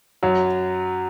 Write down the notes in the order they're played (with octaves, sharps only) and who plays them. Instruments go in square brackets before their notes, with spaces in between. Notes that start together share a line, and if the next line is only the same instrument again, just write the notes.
[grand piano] F#2 F#3